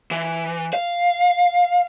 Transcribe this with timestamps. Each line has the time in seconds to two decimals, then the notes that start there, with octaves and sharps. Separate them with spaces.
0.11 E3
0.73 F5